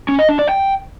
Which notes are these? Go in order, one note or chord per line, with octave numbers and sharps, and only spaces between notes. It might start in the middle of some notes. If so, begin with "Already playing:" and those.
C#4
D#5
D4
D5
G5